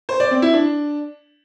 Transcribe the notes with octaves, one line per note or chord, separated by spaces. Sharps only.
C5
D5
C4
E4
D4